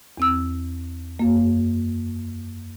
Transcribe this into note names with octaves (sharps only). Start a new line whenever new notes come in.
E2 C4 E6
F#2 A#3